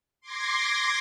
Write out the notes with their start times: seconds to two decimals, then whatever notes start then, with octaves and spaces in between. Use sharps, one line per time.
0.21 C6 D6 G#6 A#6 C7